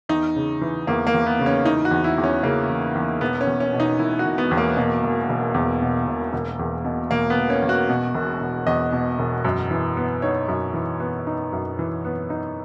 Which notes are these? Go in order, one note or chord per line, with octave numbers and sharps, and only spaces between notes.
E2 D#4
C#3
E3
E2 A#3
A#3
E2
B3
C#3
C#4
E3 D#4
F#4
E2
E4
E2
C#4
C#3 A#3
E3
E2
E1 B3
C#4
E2
C#4
B2
D#4
E1 E4
F#4
E1
B3
E2
A#3
B2 A#3
E1
E1
E2
B2
E1
E1
E2
B2
E1 A#3
B3
E1
C#4
E2
F#4
B2
E1
E1
E2 D#5
B2
E1
F#2
E3
B3
D#4 C#5
F#2
E3
B3
D#4
F#2
E3
B3
D#4